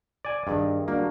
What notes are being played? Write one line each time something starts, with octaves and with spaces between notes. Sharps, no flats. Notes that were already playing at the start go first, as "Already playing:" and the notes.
D5 G#5
G2 D#3 G#4 D#5
G3 A#3 D4 F#4